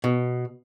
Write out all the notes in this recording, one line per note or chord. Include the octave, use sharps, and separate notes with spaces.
B2